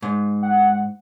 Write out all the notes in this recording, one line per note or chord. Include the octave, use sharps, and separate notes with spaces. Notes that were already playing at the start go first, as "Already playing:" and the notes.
G#2
F#5